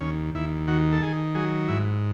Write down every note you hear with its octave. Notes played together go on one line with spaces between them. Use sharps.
D#2 C#4
D#2 E4
D#3 F#4
A4
D#3 G#4
F#3 G#4
G#2 E4